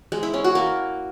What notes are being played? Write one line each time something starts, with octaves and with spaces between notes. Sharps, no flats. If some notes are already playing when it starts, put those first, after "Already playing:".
G#3
E4
C#4
F#4
A#3